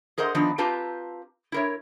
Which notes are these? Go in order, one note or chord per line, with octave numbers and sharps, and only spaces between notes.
G#4 A#4 C5 D#5 F#5
D#3 F3 B3 D4 D#4 F4
C4 F4 G4 B4 A5 A#5
E4 A#4 C#5